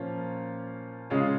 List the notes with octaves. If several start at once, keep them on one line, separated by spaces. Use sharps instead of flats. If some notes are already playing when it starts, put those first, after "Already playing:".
Already playing: A#2 F3 A#3 C#4 F4
C#3 G#3 C#4 F4